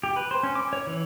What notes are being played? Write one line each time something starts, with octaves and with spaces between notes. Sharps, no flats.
G4
B4
C5
C#4
D6
C#5
E3